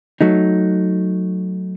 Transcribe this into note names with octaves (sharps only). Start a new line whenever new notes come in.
F#3 A3 D#4